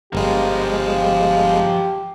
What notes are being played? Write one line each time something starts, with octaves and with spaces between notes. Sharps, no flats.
G1 F3 G#3 G4 A#4